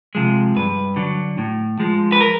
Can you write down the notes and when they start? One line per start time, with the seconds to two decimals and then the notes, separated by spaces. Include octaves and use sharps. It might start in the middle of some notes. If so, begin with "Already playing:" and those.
0.15 C3 F3 G#3
0.56 G2 B4
0.96 D3 F#3
1.38 A2
1.80 F3 G#3
2.12 B4
2.21 A#4